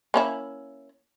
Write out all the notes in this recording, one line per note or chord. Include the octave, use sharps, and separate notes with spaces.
A#3 C#4 E4